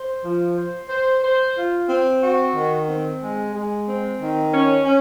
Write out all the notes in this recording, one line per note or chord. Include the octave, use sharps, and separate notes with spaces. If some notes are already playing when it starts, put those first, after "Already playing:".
Already playing: C5
F3
C5
C5
C5
F4
C4
F#4
D#3
C4
G#3
G#3
C4
D#3
C#4
C#4